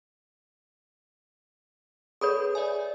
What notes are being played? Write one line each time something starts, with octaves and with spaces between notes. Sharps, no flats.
G#4 A4 B4 C#5 B5 D#6
D5 E5 G#5